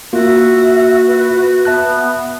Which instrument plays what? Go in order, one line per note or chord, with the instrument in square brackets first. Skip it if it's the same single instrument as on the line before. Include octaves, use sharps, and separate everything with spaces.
[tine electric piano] A#3 F4 [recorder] F#4 [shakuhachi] E5
[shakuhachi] B4
[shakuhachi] B3 [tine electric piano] E5 A5 F#6